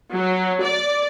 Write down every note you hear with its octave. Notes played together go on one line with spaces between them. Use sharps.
F#3
D5